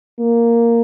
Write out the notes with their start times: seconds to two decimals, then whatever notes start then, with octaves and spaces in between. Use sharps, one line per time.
0.20 A#3